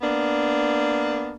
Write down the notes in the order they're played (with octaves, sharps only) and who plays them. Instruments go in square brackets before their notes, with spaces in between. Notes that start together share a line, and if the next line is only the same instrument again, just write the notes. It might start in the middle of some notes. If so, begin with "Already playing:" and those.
[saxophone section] A#3 B3 D4